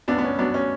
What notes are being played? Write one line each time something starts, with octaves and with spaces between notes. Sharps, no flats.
C#2 B3 D4
B3
C#4
F#3 B3 D4
C#4